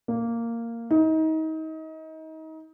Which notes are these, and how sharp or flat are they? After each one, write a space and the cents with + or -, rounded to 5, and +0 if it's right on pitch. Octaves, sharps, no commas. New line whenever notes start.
A#3 -10
D#4 +30